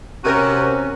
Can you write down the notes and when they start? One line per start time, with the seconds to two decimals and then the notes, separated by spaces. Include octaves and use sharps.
0.24 C3 C#4 F#4 A#4 D#7